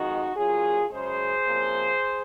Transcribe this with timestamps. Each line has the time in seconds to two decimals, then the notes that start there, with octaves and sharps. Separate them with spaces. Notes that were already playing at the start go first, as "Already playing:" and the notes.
Already playing: F2 D#3 G#3 D#4 F#4
0.36 A#2 F#3 C#4 F4 G#4
0.91 F#2 C#3 G#3 G#4 C5
1.46 C3 F3 A#3 C#4